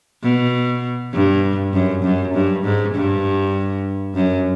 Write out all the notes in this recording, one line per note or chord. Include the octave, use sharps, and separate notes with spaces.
B2
G2
F#2
F#2
G2
G#2
G2
F#2